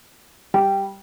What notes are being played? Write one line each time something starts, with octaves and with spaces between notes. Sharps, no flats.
G3